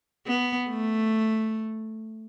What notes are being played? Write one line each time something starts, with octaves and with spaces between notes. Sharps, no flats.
B3
A3